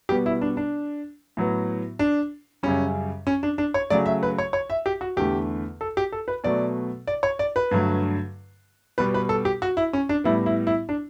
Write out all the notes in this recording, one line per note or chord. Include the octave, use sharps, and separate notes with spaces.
B2 G3 B3 G4
E4
D4
D4
A2 F#3 B3
D4
F#2 C#3 G3 C#4
C#4
D4
D4
C#5
C#3 F#3 A3 D5
E5
B4
C#5
C#5
E5
G4
F#4
E2 D3 A3 G4
A4
G4
A4
B4
B2 F#3 A3 D5
D5
C#5
D5
B4
G2 D3 F#3 A3
B2 G3 B3 B4
B4
A4
G4
F#4
E4
C#4
D4
A2 G3 B3 E4
E4
E4
D4